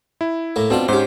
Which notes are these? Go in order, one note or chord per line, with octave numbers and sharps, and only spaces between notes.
E4
A2 A#3
B2 C4 D4 F4
G#2 C#4 G4 C5